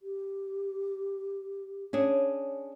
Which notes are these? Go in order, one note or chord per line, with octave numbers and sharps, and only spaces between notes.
G4
C#4 D4 G#4